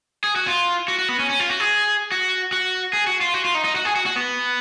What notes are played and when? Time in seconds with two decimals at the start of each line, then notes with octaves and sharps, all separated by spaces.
0.24 G#4
0.36 F#4
0.47 F4
0.88 F#4
0.99 F#4
1.09 B3
1.19 C#4
1.30 C#4
1.40 F4
1.50 F#4
1.60 G#4
2.12 F#4
2.53 F#4
2.93 G#4
3.07 F#4
3.21 F4
3.34 F#4
3.45 F4
3.55 D#4
3.65 D#4
3.76 F#4
3.85 G#4
3.96 F#4
4.06 F#4
4.16 B3